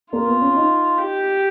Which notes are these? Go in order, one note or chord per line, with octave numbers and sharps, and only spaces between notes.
A#3 F4
B3
C#4
D#4
G4